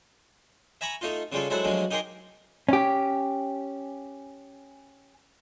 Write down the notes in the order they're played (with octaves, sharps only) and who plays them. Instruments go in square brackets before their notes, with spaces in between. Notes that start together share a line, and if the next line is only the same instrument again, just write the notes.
[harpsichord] E5 G#5 A#5 B5 C#6
A3 D#4 F4
C#3 G3 G#3 F4 A4
F#3 G#3 E4 A4 C5 F#5
D2 D3 F3 F#3 G#3
D#4 G4 G#4 A#4 C6
[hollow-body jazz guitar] C#4 G4